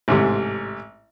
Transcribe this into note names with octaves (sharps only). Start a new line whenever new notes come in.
A1 G#2 C3